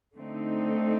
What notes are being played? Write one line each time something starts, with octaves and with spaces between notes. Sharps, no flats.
D3 A3 C4 D#4